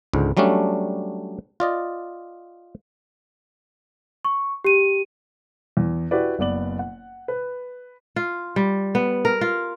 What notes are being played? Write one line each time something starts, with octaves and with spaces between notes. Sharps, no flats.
C#2 G#2 D3
F#3 G3 A3 C#4 D4
F4 D5 D#5
C#6
G4 D#7
E2
E4 F#4 G4 B4 D5
F#1 B3 D5 F#7
F#5
B4
F4
G3
B3
A#4
F4